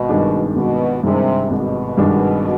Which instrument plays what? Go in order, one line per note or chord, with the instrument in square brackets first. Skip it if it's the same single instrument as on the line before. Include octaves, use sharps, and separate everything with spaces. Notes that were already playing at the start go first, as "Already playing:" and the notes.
Already playing: [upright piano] G#1 [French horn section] B2
[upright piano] G2 D#3 G#3 D4
[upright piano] G#1 [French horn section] B2
[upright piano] G2 D#3 G#3 D4 [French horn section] C3
[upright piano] G#1 [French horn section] B2
[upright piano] G2 D#3 G#3 D4